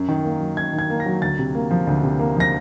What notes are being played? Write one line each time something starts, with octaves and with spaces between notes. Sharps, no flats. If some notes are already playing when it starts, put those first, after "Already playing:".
Already playing: F#2
D#3
A#3
F#3
F#2 G#6
D#3
G#6
A#3
A#6
F#3
D2 A6
C3
A#3
F3
D2
C3
A#3
F3 A#6